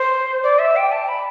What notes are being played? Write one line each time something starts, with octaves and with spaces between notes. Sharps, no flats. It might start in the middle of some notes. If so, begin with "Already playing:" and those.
Already playing: C5
D5
E5
G5
A5
B5